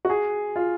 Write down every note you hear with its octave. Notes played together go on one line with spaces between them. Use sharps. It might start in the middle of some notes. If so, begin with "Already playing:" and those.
F#4
G#4
F4